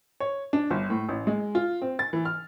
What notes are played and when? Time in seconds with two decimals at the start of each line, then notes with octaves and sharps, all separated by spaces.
0.20 C#5
0.53 D4
0.70 G1
0.90 A2
1.09 A1
1.27 G#3
1.55 F4
1.82 C4
1.99 A6
2.13 E3
2.25 F6